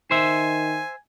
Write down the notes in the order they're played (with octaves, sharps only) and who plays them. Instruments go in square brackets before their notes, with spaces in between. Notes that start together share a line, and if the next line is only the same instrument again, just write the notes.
[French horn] D#3 [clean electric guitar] C5 E5 [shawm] G#5